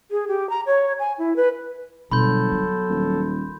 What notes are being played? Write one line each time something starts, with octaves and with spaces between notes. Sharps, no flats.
G#4
G4
A#5
C#5
G#5
E4
B4
G1 B2 F#3 A4 B5 C6 G6
B3
D#1